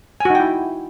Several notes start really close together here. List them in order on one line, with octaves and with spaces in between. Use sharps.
G#5 F#4 D#4 G5 E4